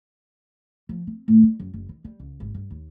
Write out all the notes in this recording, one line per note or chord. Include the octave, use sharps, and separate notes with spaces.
F3
C4
A2
G3
F#2
F#1
D#3
G3
C#2
G#1
G2
D#2